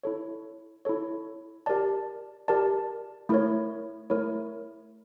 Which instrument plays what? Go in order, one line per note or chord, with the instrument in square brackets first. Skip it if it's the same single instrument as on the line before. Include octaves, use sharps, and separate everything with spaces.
[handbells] E4 A4 C#5
E4 A4 C#5
G4 A#4 D5 A5
G4 A#4 D5 A5
A3 E4 A#4 C#5
A3 E4 A#4 C#5